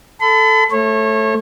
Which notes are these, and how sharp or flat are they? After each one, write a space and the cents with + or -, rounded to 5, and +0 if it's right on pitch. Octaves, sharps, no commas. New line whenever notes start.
A4 +0 B5 +40
A3 +0 C#5 -30